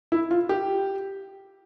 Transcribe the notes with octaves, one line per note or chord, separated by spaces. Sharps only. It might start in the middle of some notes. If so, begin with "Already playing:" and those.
E4
F4
G4